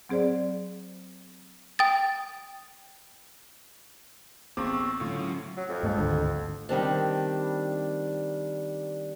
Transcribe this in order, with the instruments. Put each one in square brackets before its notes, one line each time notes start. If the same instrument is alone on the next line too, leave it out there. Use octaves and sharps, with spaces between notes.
[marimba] F#3 C4 G#4 C5 D5
[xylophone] G5 D#6 A6
[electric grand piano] A1 C4 D6 [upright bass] B3 D4 [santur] A4 C#6 E6
[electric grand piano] A2 F4 [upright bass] D3 A3 [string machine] F#3 C#4 F#4
[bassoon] F#3
F2
[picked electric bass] G2 G#3 A3
G#1 D2 D3
[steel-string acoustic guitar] D#3 G3 C4 D4